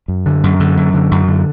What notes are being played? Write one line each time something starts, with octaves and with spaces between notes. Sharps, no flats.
F#2
D3
F#2
D3
F#2
D3
F#2
D3